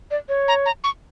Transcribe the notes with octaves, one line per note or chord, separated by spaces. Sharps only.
D5
C#5
A#5
A#5
C#6